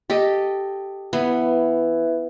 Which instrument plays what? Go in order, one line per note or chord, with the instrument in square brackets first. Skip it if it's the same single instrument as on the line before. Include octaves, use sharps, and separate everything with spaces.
[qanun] G4 A4 D#5
[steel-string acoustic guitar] E3 [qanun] B3